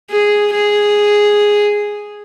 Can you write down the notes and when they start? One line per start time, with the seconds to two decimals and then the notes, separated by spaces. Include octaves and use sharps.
0.11 G#4
0.53 G#4